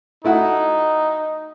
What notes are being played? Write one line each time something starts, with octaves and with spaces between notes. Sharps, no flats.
A3 D#4 E4 F#4